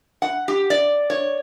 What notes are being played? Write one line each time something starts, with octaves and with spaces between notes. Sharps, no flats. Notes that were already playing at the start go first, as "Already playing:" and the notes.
F#5
G4
D5
C#5